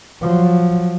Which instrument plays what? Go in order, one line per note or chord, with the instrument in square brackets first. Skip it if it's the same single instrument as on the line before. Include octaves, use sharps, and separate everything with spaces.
[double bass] F3 F#3